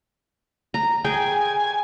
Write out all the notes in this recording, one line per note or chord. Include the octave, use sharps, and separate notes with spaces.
A#5
G#4 G5 G#5